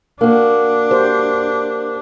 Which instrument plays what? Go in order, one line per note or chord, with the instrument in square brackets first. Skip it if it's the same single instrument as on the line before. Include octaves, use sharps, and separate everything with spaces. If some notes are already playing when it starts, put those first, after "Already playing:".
[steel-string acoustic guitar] A#3 F#4 [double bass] D4
[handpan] G4 C5